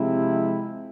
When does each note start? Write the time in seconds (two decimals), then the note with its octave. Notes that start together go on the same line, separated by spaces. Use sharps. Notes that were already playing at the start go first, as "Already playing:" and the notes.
Already playing: C3 F3 G#3 C4 E4